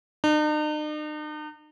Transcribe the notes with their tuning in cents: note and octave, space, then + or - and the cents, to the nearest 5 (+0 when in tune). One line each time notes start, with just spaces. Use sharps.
D#4 -45